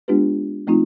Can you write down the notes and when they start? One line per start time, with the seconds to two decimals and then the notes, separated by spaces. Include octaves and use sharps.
0.08 G#3 B3 D4 F4 G4 B4
0.67 F3 A3 C4 D#4 F4